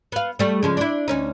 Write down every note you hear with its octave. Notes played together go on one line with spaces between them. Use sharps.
B3 F5
G3 A3
C#3 F3 G#3
D4 E4
D2 C#4 D#4